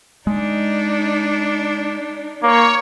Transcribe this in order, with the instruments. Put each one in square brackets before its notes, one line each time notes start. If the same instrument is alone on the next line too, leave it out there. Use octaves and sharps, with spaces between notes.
[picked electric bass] G#3 [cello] D4 D#4
[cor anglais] A#3 [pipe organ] C#5